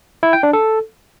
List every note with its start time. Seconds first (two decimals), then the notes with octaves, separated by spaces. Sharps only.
0.23 E4
0.33 G5
0.43 D4
0.53 A4